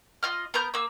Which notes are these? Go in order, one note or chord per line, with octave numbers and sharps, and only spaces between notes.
F4 D#5 F6
B3 A#4 A#5 G6
A#3 E6